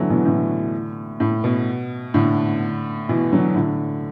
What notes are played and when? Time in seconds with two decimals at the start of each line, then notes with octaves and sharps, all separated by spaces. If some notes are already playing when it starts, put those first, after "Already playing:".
Already playing: D3 E3 F#3 A3
0.10 B2 E3
0.25 A2 D3
1.20 A2
1.44 B2
2.14 A2 D3
3.09 B2 E3
3.32 D3 F#3
3.56 A2 D3